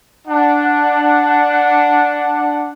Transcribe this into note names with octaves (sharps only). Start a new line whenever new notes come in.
D4 F#5